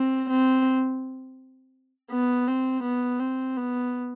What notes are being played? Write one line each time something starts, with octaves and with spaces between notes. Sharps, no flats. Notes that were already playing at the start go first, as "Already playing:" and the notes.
Already playing: C4
C4
B3
C4
B3
C4
B3